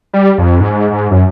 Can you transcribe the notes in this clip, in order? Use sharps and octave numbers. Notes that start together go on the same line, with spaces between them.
G3
F2
G#2
G#2
F#2